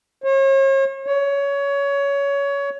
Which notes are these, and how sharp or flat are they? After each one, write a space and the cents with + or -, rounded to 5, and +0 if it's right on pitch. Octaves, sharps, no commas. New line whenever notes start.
C#5 -40
C#5 +20